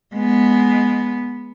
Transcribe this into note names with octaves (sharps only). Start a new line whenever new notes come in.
G#3 B3